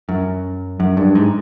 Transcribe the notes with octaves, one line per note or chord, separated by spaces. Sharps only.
F#2
F#2
G2
G#2